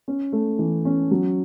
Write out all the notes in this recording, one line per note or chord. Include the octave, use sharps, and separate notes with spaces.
C#4
A3
E3
C#4
F#3